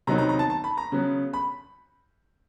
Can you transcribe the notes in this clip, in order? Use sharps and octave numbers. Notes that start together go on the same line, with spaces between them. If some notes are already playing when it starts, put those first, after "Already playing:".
C3 D#3 F#3 B3 D#4 A#5
A#5
A#5
A5
A5
B5
A#5
C#3 F#3 B3
B5